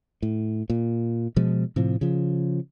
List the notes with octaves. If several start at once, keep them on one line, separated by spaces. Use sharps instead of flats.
A2
A#2
B2 F3 G#3
A2 C3 F3
C#3 F3